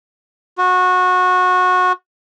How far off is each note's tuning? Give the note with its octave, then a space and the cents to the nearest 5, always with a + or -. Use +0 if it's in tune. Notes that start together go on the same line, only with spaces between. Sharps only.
F#4 -20